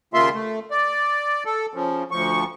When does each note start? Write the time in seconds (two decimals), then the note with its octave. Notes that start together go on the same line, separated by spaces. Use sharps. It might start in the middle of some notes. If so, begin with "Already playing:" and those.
0.14 D#2 C#3 A#3 F4 E5 C6
0.34 A3
0.71 D5
1.46 A4
1.74 C#3 F3
2.11 D2 F3 C#6